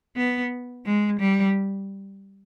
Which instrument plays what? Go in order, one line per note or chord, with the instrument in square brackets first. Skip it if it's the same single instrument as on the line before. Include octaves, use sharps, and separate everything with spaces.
[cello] B3
G#3
G3